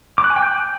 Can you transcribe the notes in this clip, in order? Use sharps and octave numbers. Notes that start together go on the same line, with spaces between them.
D6
F#6
G#5
G5
G6